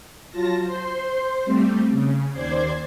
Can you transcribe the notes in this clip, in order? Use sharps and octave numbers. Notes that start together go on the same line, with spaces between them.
F#3 F4 A5 A#6
C5 C6
G3 A3 C4
C#3
D#2 C5 D5 G#6 C7